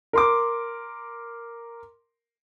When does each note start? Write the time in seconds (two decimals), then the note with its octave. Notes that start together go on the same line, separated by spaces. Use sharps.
0.13 A#4 C6 D6